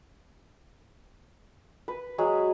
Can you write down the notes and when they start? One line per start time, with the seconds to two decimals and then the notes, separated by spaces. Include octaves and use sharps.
1.88 B4
2.18 F#3 G#3 G#4